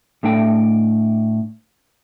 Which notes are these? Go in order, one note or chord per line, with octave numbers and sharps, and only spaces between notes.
A2 A3 D4 G5